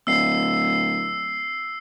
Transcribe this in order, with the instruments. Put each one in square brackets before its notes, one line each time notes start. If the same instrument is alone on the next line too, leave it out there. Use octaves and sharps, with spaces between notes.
[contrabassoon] D1 [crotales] E6 C7